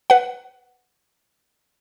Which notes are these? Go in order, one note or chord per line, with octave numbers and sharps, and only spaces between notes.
B4 F#5